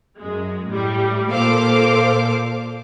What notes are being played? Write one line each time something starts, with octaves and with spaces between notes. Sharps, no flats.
F#2 G#3
A2 G3
A#2 A4 C5 F5 D6